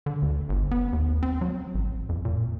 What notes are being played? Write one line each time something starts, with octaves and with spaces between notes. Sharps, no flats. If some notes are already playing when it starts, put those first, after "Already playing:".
D3
D2
G1
B3
D#2
C4
F#3
A1
F2
A#2